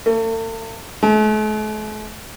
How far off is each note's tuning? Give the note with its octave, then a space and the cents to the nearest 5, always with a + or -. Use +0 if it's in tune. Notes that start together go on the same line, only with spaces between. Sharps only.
A3 +40
A3 -45